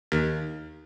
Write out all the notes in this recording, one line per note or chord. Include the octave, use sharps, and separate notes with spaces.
D#2